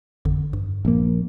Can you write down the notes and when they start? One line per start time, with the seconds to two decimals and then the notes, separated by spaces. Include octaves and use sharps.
0.25 A1 F2 D3
0.53 G2
0.85 A#1 A#3